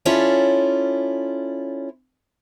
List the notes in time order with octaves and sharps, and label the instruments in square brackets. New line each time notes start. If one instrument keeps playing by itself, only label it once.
[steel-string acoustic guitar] C#4 E4 F4 A4 C#5 D5